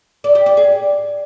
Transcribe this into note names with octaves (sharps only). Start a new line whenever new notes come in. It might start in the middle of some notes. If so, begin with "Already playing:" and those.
D5
G4
D5
G#4